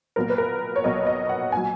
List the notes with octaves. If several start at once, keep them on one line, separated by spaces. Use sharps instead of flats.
B1 A#2 F#3 B3 A#4
B4
A#4
C#5
B1 A#2 F#3 B3 D#5
D#5
F#5
A#2 F#3 G#5